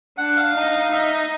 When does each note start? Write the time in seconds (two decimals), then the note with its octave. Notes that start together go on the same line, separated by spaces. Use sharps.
0.18 D4 F#5
0.36 F5
0.55 D#4
0.92 D#4 E5